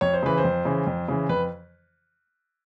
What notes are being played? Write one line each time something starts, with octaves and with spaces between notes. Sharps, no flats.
F2 C#5
C5
C#3 E3 B4
C5
F2
C#3 E3
F2
C#3 E3
F2 B4